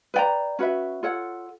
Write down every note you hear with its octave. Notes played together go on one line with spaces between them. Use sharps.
B4 D5 G5 A#5
C#4 F#4 B4 E5
F4 A4 C#5 F#5